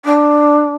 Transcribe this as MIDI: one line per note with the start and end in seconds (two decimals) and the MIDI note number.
0.05 0.74 62